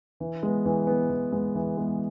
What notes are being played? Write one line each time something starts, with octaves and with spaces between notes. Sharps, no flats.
E3
G#3 B3
E3
G#3 B3
E3
G#3 B3
E3
G#3 B3